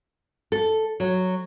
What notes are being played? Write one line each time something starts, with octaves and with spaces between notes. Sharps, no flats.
A4
F#3